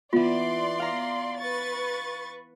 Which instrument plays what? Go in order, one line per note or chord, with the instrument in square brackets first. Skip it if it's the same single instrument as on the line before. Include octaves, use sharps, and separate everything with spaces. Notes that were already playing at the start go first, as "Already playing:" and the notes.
[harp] E3 B3 [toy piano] F4 [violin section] D5 C6
[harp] F5 A#5
[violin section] B4 C#6 A6